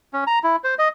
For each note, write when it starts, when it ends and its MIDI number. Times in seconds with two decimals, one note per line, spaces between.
0.13 0.24 61
0.27 0.39 82
0.44 0.56 64
0.64 0.75 72
0.79 0.88 75